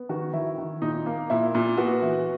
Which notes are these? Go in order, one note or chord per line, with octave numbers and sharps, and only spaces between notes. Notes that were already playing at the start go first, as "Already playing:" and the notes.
Already playing: B3
D#3 F#4
D#3 E4
D#3
A#2 D#4
A#3
A#2 E4
A#2
B3 F#4
E3